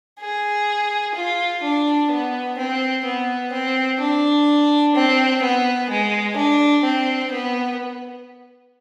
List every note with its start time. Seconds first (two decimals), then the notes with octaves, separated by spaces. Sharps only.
0.21 G#4
1.15 F4
1.63 D4
2.11 B3
2.58 C4
3.05 B3
3.53 C4
4.01 D4
4.95 C4
5.42 B3
5.90 G#3
6.36 D4
6.84 C4
7.32 B3